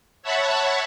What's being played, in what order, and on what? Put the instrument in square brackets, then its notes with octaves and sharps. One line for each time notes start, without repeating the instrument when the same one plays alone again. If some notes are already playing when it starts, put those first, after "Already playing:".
[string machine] C#5 E5 F#5 A5 B5 C#6